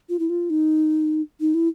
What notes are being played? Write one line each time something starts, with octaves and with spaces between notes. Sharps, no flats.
F4
E4
F4
D#4
D#4
E4